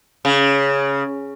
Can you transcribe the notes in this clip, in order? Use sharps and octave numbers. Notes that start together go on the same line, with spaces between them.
C#3